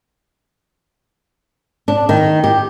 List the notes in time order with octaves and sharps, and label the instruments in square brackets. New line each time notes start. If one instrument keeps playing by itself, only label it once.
[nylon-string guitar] D4
D#3
G4